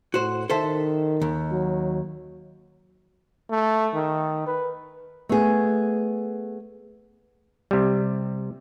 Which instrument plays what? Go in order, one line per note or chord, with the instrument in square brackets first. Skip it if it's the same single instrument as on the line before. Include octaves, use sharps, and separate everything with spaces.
[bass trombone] A2 [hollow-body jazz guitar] F#4 C5
[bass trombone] D#3 [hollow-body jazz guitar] A4 C5 E5
[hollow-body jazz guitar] D#2
[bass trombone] F#3
[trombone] A3
D#3
B4
[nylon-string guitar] A3 B3 G#4
[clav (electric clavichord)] C3 G3